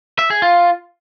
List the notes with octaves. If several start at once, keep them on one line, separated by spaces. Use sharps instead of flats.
E5
G#4
F4